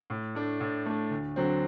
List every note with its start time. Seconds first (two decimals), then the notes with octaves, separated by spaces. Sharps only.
0.10 A2
0.35 A3 D4
0.60 A2
0.86 A3 D4
1.11 D2
1.36 D3 F#3 C4